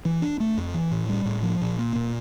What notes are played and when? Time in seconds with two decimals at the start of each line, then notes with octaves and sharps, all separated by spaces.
0.05 E3
0.22 D4
0.40 A3
0.57 F2
0.74 E3
0.91 A2
1.09 G3
1.26 A2
1.43 F3
1.61 A#2
1.79 A#3
1.95 A#2